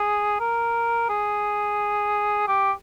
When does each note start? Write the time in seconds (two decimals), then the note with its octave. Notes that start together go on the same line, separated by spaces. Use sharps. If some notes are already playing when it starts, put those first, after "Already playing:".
Already playing: G#4
0.40 A#4
1.10 G#4
2.48 G4